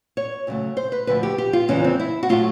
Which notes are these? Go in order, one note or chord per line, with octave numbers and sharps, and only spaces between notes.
C#5
D2 C#3 F#3 A3
C5
B4
D2 D3 F3 A3 B4
G4
G4
F4
E2 C#3 E3 G#3 C#4
C4
E4
F#4
A2 F#3 A3 F4